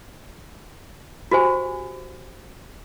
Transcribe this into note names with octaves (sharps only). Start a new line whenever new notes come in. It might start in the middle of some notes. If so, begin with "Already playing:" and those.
F#4 G4 C5 G#5